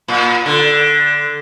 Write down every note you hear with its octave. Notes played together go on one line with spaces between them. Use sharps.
A#2
D3